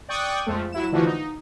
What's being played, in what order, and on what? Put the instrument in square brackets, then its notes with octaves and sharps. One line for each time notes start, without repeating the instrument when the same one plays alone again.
[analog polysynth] D5 G5 C#6 D#6 F#6
F2 F3 G#3 A3
F#3 E4 E7
D3 E3 F3 A3 F#4
D#4